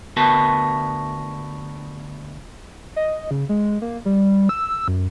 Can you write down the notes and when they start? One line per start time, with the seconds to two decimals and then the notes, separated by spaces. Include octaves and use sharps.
0.17 D2 B3 F#4 A#4 B4 A5
2.96 D#5
3.31 C#3
3.49 G#3
3.82 A#3
4.05 G3
4.49 E6
4.88 F#2